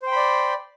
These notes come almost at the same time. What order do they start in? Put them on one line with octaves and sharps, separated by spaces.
C5 G5 B5 D5